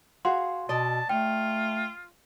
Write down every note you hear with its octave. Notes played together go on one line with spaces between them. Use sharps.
F#4 G#4 F5 C6
B2 D5 D#5 A5
A3 F4 G5